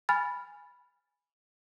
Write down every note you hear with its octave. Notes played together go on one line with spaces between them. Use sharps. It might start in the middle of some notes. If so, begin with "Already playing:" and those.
G#5 B5 F6 A6